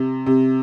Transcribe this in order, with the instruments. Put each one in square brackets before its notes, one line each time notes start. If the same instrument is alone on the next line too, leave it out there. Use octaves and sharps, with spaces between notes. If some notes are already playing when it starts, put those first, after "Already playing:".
Already playing: [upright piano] C3
C3